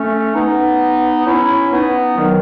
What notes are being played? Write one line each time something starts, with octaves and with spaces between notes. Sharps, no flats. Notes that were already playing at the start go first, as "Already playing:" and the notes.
Already playing: A3 C#4
B3 D#4
C#4 E4
B3 D#4
D#3 F#3